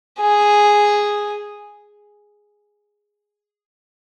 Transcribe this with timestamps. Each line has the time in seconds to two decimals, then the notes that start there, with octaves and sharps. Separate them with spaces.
0.20 G#4